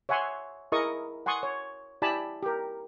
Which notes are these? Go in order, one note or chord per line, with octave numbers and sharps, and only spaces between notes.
C#5 E5 F#5 G#5 C6
E4 G#4 A#4 D#5 C#6 D#6
F#5 G#5 C6 C#6 D#6
C#5
E4 G4 D5 G#5 A5 B5
G4 A#4